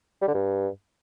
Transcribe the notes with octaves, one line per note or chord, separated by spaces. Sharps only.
G3
D3
G2